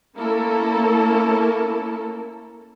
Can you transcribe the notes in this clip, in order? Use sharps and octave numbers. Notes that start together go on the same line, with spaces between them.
A3 A#3 C#4 E4 A4 A#4